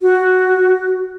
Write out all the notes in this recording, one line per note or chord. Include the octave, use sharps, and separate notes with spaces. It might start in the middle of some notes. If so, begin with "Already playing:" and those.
F#4